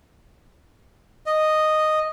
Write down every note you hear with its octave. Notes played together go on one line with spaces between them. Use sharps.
D#5